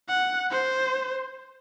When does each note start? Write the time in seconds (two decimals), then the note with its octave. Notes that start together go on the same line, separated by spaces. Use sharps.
0.08 F#5
0.51 C5